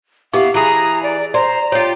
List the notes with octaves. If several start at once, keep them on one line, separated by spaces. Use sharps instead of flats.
B3 E4 G4 F5 D6
E3 G#4 A#5
D5
C5 D5 A#5
F4 G4 C#5